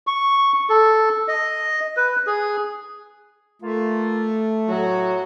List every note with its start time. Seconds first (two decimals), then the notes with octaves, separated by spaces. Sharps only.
0.07 C#6
0.70 A4
1.28 D#5
1.97 B4
2.27 G#4
3.62 A3 A#3 F4
4.69 A2 F#3 F#4